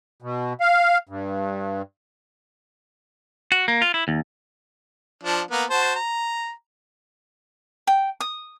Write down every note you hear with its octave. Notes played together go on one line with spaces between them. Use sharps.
B2
F5
G2
F#4
A#3
F4
E4
D#2
F3 D4
A#3 B3
F#4 C5 A5
A#5
G5
D#6